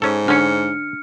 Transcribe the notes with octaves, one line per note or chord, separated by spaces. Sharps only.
G#2 C#4 A4
D3 C#4 D4 F6 C#7